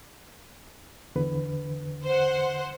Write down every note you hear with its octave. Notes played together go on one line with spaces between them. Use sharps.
E2 D3 B4
C5 F#5